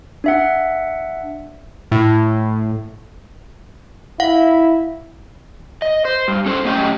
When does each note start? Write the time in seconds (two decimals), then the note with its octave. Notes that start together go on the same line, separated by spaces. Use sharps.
0.24 D4 E5 F#5
1.92 A2
4.20 E4 F5 F#5
5.82 D#5
6.05 C5
6.28 G2
6.46 C#4 A4 C5
6.65 F#2 A3 C#4 G4 D#5 G5